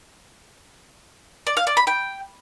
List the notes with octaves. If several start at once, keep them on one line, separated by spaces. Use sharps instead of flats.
D5
F5
D5
B5
G5